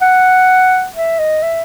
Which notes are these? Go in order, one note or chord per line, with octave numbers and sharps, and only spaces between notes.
F#5
E5
D#5
E5